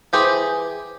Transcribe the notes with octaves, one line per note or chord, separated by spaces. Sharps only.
E3 G4 G#4 C5